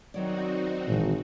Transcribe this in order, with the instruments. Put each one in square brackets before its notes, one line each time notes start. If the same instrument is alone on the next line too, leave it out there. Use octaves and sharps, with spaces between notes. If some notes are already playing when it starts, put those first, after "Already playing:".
[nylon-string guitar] D#3 F#3 D5 [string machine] C4 D#4 F#4
[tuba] G#1 [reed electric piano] A#2 E3